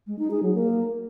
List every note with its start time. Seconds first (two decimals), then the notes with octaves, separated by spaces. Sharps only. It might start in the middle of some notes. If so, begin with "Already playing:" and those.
0.07 G#3
0.19 D#4
0.31 G#4
0.42 F#3
0.54 A#3